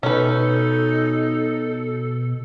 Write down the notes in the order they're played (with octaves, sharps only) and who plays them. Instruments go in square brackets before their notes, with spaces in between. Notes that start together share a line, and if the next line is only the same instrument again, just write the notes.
[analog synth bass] B2 [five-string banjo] C#4 B4 [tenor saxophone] D#4 [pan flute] A4